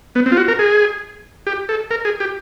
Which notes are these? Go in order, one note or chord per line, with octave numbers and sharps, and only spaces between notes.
B3
C4
F4
F#4
A#4
G#4
G4
A4
A#4
G#4
G4